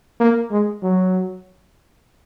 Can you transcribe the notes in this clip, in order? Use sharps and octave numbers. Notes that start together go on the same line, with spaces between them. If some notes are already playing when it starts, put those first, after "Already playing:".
A#3
G#3
F#3